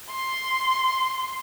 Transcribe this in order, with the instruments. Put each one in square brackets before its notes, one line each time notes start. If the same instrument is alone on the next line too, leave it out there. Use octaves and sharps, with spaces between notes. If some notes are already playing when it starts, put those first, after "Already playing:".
[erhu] C6